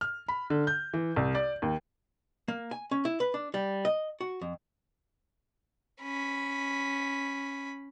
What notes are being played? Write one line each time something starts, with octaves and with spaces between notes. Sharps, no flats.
F6
B5
D3
G6
E3
C2
D5
D#2
A#3
G#5
C#4
E4
B4
D4
G3
D#5
F#4
F2
C#4 B5